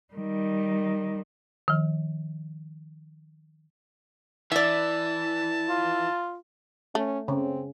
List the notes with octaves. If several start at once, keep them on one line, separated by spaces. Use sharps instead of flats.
D#3 G3
D#3 F3
E3 D5 E5 A5
F4
A3 C#4
C#3 C4